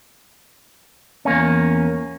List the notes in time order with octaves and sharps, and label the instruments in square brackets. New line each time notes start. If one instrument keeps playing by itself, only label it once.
[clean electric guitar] E2 A#3 C#4